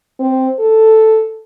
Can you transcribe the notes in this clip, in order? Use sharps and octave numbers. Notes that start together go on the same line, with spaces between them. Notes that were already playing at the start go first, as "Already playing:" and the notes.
C4
A4